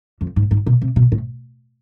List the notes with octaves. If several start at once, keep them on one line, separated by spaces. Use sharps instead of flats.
F2
G#2
G#2
B2
C3
B2
A2